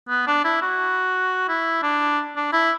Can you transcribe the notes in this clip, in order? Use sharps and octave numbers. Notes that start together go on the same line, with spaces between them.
B3
D4
E4
F#4
E4
D4
D4
E4